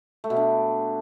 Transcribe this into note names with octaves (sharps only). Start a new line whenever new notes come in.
A3
B2
D4